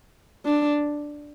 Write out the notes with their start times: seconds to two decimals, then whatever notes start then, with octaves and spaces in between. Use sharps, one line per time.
0.46 D4